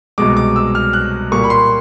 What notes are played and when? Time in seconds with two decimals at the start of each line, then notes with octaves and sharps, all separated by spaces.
0.18 C2 B2 G#3 D6
0.37 D6
0.56 E6
0.75 F6
0.93 F#6
1.32 A#2 G3 A#3 C#6
1.44 B5
1.50 C6